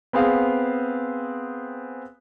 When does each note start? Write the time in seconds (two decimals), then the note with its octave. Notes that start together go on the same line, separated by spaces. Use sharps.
0.13 B3 C4 G#4 F5